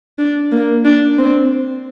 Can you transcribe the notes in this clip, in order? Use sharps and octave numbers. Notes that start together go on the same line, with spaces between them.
D4
A#3
D4
C4